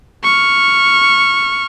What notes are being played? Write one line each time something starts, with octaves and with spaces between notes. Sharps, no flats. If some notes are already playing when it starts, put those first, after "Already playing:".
C#6 F6